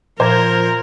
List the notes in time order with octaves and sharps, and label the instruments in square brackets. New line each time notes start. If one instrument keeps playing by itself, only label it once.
[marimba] A#2 [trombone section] F3 [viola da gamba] A#4 [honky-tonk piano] C5 A#5 G#6